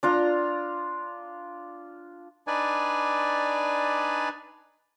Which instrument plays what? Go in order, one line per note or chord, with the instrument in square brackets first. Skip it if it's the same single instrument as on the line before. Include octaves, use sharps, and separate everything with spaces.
[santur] D4 F4 A#5
[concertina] D4 D#4 B4 D5 G#5